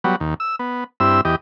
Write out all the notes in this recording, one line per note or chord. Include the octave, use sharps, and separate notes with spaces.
F#3 G3 B3
D#2
E6
B3
G2 C4 E4 E6
E2 G4 D#5